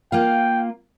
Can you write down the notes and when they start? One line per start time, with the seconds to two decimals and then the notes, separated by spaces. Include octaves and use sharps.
0.12 A#3 F4 F5 G5